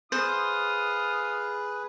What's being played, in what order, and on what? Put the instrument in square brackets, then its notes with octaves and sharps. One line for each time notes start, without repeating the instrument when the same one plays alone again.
[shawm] F4 [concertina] G#4 B4 [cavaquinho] C5 [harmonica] D#6